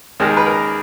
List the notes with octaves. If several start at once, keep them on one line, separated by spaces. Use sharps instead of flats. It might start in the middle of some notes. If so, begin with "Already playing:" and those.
D#2 D#3 G#3
B4
A#4